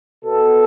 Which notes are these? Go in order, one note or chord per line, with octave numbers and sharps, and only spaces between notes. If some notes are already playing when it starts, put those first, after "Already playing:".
B2 B3 A4